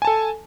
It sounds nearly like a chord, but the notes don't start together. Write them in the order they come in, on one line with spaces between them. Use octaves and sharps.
G#5 A5 A4